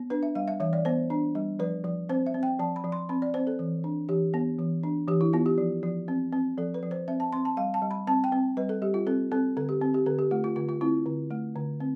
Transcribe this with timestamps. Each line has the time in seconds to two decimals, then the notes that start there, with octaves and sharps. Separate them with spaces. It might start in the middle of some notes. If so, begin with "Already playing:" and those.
Already playing: B3
0.10 D4 B4
0.23 E5
0.35 G3 F5
0.48 E5
0.60 E3 E5
0.73 D5
0.85 B3 C5
1.10 D4
1.35 G3
1.59 F3 B4
1.84 F3
2.09 C4 C5
2.26 E5
2.34 C4
2.43 G5
2.59 F3 A5
2.76 B5
2.84 F3
2.92 C6
3.09 C4 B5
3.22 D5
3.34 C4 C5
3.47 A4
3.59 E3
3.84 D4
4.09 E3 G4
4.34 B3
4.59 E3
4.83 D4
5.08 E3 G4
5.21 E4
5.33 B3 F4
5.46 G4
5.58 F3
5.83 F3
6.08 C4
6.33 C4
6.58 F3 A4
6.74 B4
6.83 F3
6.91 C5
7.08 C4 E5
7.20 A5
7.33 C4 C6
7.45 A5
7.57 G3 F5
7.74 A5
7.82 G3
7.91 B5
8.07 C4 A5
8.24 G5
8.32 C4
8.57 G3 B4
8.69 A4
8.82 G3 G4
8.94 F4
9.07 C4 A4
9.32 C4 A4
9.57 D3 A4
9.69 G4
9.81 C4
9.94 G4
10.06 D3 A4
10.19 G4
10.31 A3 F4
10.44 F4
10.56 D3 F4
10.69 F4
10.81 C4 E4
11.06 D3
11.31 A3
11.56 D3
11.80 C4